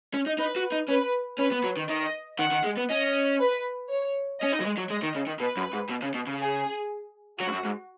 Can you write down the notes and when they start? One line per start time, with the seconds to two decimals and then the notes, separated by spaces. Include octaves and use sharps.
0.14 C#4
0.26 D#4
0.38 D#4 B4
0.56 F#4
0.72 D#4
0.89 C#4 B4
1.39 C#4 B4
1.52 B3
1.64 F#3
1.77 D#3
1.89 D#3 D#5
2.39 D#3 F#5
2.52 D#3
2.64 G#3
2.77 B3
2.90 C#4 D#5
3.39 B4
3.89 C#5
4.40 C#4 D#5
4.52 D#4
4.60 F#3
4.65 G#3
4.77 F#3
4.90 G#3 D#5
5.02 D#3
5.15 C#3
5.27 D#3
5.40 B2 B4
5.57 F#2
5.73 G#2
5.90 B2
6.03 C#3
6.14 B2
6.27 C#3
6.40 G#4
7.40 F#3 F#4
7.47 G#2
7.52 F#2
7.65 G#2